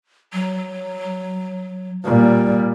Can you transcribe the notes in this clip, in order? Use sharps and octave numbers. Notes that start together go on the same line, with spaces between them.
F#3
A#2 G3